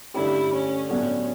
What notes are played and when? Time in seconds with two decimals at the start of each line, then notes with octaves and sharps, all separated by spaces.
0.14 G2 D3 A3 C#4 E4 G4
0.52 C#4
0.90 A2 F#3 B3 C#4 D4 F#4